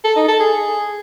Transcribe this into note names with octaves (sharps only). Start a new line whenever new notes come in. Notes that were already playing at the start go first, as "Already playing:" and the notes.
A4
D#4
A4
G#4